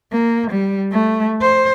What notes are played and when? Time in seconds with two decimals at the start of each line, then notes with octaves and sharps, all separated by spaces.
0.12 A#3
0.51 G3
0.92 A3
1.41 C5